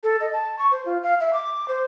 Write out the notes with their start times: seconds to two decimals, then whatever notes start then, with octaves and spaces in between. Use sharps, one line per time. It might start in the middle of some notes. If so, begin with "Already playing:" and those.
0.04 A4
0.21 D#5
0.33 A5
0.59 C#6
0.71 C5
0.86 F4
1.03 F5
1.20 E5
1.33 D6
1.68 C5